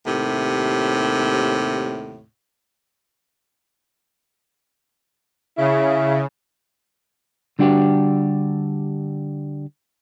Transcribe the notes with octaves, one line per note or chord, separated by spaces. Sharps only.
D#2 A2 C3
C#3 E4
D3 G3 D4 F#4 G4